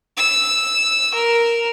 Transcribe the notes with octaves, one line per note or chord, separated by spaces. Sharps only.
E6
A#4